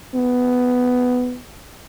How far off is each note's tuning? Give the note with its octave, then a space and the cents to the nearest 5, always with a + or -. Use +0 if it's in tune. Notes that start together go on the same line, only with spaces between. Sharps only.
B3 +10